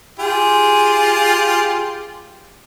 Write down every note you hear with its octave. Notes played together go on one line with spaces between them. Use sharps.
F4 G4 G#4